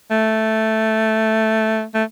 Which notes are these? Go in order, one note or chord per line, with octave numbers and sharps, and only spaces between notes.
A3
A3